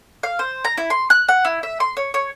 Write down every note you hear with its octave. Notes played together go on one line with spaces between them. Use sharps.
F5
C5
A#5
E4
C6
F#6
F#5
E4
E5
C6
C#5
C#5